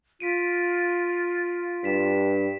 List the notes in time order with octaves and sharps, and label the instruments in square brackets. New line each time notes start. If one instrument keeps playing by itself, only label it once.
[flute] F4 [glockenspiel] B6 D7 D#7
[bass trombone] G2 [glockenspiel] B6 E7